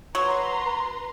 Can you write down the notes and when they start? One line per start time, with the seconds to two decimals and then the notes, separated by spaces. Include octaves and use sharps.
0.15 F#3 B4 A#5 C6